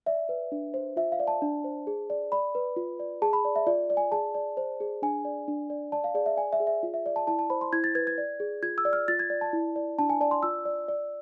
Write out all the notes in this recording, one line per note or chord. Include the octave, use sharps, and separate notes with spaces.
D5 E5
B4
D4
C5
F4 E5
F5
D5
A5
D4
C5
G#4
D5
D5 B5
B4
F4
D5
G#4 A5
B5
D5
E5
F4 D5
D5
G#5
G#4 A5
D5
C5
G#4
D4 G#5
D5
D4
D5
D5 A5
F5
G#4 D5
E5
D5 G#5
E5
G#4
E5
F4
E5
D5
A5
E4 A5
A5
C5 B5
C6
E4 G#6
A6
B4 G#6
G#6
D5
G#4
F4 G#6
E6
D5
F6
F4 A6
G#6
D5
A5
E4
D5
D4 A5
G#5
D5 A5
C6
F4 E6
D5
D5